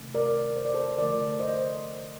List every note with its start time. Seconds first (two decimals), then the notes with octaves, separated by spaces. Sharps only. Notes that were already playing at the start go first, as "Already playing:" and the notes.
Already playing: C3 D#3 A3
0.14 A#4 D5
0.56 C5
0.65 D5
0.74 A4 C5
0.88 C5
0.98 D3 F3 A3 A#4 D5
1.40 C5 D#5